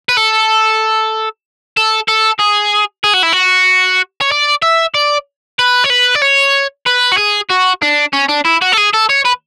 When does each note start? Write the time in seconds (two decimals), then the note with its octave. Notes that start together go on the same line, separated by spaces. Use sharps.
0.09 B4
0.17 A4
1.77 A4
2.08 A4
2.39 G#4
3.04 G#4
3.14 F#4
3.23 E4
3.33 F#4
4.21 C#5
4.32 D5
4.62 E5
4.94 D5
5.59 B4
5.84 C#5
5.90 B4
6.15 D5
6.22 C#5
6.86 B4
7.12 F#4
7.17 G#4
7.50 F#4
7.82 D4
8.13 C#4
8.29 D4
8.45 E4
8.62 F#4
8.72 A4
8.77 G#4
8.93 A4
9.09 C#5
9.25 B4